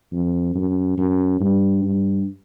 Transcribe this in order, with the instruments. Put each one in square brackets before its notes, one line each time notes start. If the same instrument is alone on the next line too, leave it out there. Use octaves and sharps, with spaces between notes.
[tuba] F2
F#2
F#2
G2
G2